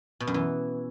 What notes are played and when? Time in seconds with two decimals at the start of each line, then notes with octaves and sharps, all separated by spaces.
0.20 B2
0.27 F#2
0.34 E3